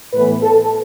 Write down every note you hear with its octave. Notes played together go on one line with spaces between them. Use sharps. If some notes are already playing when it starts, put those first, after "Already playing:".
A2 E3 B3 B4
A4